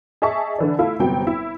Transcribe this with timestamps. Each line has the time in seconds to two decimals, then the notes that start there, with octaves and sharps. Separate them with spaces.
0.22 G#4 D#5 E5 A5 C#6
0.59 D3 E3 D5
0.79 A3 E4 F4
1.00 G1 C3 F#3 G5
1.27 E4